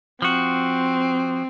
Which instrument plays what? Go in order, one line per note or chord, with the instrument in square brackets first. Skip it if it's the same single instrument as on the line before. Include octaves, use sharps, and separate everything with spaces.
[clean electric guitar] F3 F#4 [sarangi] C4